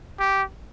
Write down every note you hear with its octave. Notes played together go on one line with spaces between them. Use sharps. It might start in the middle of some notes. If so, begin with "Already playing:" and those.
G4